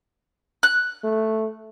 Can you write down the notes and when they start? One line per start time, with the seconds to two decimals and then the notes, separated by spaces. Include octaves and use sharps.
0.63 F#6
1.04 A3